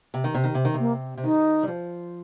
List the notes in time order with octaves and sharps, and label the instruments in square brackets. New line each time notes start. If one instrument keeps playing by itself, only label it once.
[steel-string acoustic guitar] C3
D#3
C3
D#3
C3
D#3
C3
[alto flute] A#3
[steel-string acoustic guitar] C3
[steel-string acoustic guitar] D#3 [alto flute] D#4
[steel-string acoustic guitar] G3
F3